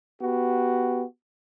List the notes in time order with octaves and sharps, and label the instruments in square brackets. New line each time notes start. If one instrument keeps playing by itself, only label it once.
[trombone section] B3 F#4 G4